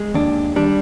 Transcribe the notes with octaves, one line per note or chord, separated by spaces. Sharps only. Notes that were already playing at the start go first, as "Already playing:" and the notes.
Already playing: G#3
D#2 D4
G3 D4